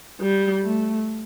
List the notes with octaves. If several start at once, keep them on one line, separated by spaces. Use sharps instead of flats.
G3
A3